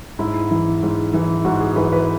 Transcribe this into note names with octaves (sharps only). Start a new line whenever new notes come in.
G#2 E4
E3
G#2
E3
G#2 F#4
G#4
E3 B4
B4